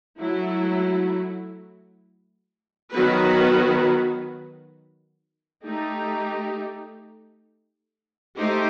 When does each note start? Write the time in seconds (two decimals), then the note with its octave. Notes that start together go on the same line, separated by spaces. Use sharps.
0.19 F#3 A3 E4
2.92 D#3 F#3 B3 F#4 B4
5.64 A3 D#4 G4
8.37 A3 D#4 G4 C5